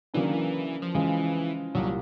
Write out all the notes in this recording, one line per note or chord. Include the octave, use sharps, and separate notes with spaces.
C#3 E3 F#3 A#3 D4
D#3
E3
F3
C#3 E3 F3 G#3
C2 A#2 F#3 G3